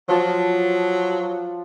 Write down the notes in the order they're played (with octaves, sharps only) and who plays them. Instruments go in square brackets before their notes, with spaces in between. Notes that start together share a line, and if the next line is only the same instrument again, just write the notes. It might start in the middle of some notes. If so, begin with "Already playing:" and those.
[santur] F3 A5 [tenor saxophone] F#3